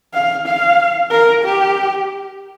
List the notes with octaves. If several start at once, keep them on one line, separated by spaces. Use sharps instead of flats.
F5
F5
A#4
G4